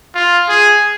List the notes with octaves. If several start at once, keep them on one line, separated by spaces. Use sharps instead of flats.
F4
G#4